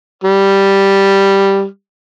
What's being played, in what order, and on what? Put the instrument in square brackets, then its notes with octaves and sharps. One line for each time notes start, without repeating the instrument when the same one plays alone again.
[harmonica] G3